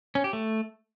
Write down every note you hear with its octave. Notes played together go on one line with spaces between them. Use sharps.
C#4
G4
A3